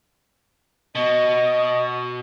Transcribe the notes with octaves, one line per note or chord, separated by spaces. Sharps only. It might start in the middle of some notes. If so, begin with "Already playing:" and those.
B2 D#5